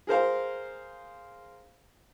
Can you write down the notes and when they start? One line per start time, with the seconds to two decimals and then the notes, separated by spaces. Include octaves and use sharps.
0.07 G#4 A#4 C5 F5